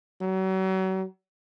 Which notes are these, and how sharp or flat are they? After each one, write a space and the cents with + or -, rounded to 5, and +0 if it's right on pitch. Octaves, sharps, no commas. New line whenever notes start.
F#3 +35